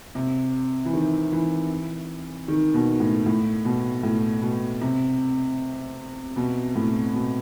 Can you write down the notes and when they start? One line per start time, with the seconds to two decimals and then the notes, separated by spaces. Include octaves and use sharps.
0.15 C3
0.85 E3
0.93 D#3
1.32 E3
2.48 D#3
2.74 B2
3.00 A2
3.26 A2
3.65 B2
4.03 A2
4.42 B2
4.81 C3
6.36 B2
6.75 A2
7.14 B2